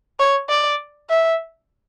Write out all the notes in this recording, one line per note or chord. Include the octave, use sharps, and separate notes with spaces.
C#5
D5
E5